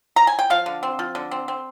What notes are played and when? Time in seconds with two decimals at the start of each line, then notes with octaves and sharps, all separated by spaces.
0.16 A#5
0.27 G#5
0.39 G5
0.50 F3 F5
0.66 D3
0.83 C4
0.99 F3
1.15 D3
1.31 C4
1.48 C4